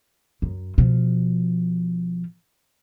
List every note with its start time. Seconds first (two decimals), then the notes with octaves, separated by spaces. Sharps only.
0.42 F#2
0.78 B2 F3